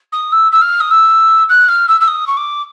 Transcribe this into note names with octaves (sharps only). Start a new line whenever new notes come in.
D#6
E6
E6
F6
D#6
E6
F#6
F6
E6
E6
D#6
C#6
D6